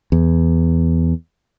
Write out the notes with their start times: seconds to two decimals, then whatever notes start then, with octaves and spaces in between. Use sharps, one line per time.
0.12 E2